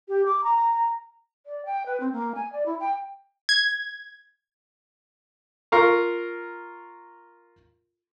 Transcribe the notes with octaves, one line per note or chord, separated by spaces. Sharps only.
G4
D6
A#5
D5
G5
B4
C4
A#3
G#5
D5
E4
G5
G#6
F4 A#4 F5 A#5 C#6